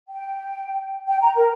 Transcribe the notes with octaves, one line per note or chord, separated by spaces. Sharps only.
G5
G5
A#5
A#4